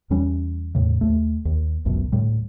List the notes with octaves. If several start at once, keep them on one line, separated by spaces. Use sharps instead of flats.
E2 E3 G3 C#4
E2 A2 C#3
D#2 A3
D#2
G#1 C#2 F#2 B2
D2 A2 G3